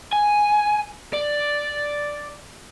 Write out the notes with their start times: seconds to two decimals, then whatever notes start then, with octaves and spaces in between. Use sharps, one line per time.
0.12 G#5
1.13 D5